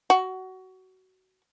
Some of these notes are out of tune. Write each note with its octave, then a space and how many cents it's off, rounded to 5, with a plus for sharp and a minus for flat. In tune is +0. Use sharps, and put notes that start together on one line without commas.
F#4 +20